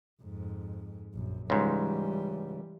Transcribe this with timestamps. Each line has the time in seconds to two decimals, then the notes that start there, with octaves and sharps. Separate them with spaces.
0.23 F2 G#2
1.14 A#1 F#2
1.50 C#2 G#2 E3 G3